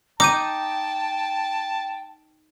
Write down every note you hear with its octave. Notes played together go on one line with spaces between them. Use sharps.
D#4 G5 A5 D6 G6 D#7